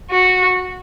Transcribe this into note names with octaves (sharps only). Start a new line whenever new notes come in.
F#4